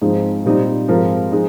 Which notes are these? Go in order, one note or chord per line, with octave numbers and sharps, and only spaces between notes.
G#2 F3 G#3 C4 D#4
A#2 G3 C4 D#4 G4
G#2 F3 C4 F4 A#4
F3 G#3 D#4